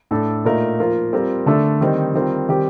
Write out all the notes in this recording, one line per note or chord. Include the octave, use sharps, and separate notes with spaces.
A2 A3 D4 A4
A#2 A3 D#4 A#4
F3 A#3 F4 A#4
G3 C4 F4 A#4
D3 A3 D4 A4
D#3 G3 C4 D#4
D#3 G3 C4 F4 A#4
D#3 G3 C4 G4